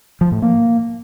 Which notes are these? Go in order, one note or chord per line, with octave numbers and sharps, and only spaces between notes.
F3
A2
A#3